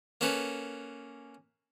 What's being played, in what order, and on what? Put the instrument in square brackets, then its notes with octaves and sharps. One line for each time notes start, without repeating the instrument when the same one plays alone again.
[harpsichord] A#3 C#4 A4 B4